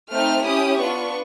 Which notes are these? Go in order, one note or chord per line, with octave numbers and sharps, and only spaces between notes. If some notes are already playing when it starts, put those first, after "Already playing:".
A3 C4 D#4 F6
C#4 E4 G4 D#6
B3 D4 F4 C#6